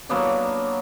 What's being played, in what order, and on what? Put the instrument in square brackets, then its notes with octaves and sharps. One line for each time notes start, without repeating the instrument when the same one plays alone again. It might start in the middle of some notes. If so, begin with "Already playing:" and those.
[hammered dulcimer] F#3 A#3 B3 D4